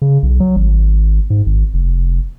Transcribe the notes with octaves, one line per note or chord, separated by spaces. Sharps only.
C#3
B1
F#3
G#1
G#2
G#1
F1